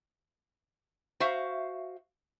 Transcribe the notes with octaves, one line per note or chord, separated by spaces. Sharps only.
F#4 C5 E5 F5